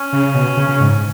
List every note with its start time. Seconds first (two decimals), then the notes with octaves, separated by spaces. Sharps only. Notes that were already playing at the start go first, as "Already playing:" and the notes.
Already playing: C#4
0.13 C#3
0.34 B2
0.57 C#3
0.68 C#3
0.81 G#2